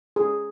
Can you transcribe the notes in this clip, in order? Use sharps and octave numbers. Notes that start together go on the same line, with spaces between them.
G#4